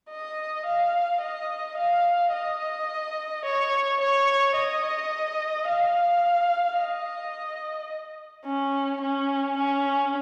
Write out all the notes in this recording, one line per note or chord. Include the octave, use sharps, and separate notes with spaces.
D#5
F5
D#5
F5
D#5
C#5
C#5
D#5
F5
D#5
C#4
C#4
C#4